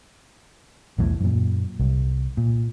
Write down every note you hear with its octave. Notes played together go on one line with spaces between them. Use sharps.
B1 E2 A2
F#2 A#2
C2
A#2